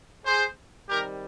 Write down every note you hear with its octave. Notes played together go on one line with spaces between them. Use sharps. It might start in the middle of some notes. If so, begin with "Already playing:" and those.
G#4 C5
C3 D#3 G3 G4 A#4